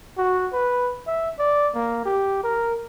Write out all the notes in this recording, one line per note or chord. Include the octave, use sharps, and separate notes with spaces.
F#4
B4
E5
D5
A#3
G4
A#4